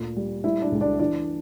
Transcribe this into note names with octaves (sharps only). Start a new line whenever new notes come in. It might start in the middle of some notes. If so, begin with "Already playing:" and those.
Already playing: D2 A#2
G3
G3 E4 E5
D4 D5
C#2
D4 D5
E3 D4 D5